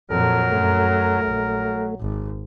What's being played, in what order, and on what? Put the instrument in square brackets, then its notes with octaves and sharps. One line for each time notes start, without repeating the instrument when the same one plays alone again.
[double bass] F2 A#2 [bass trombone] F#3 [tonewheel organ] A4 [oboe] A#4
[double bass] F#2 [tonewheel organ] A3
[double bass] A#1 [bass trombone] F#3
[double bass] G#1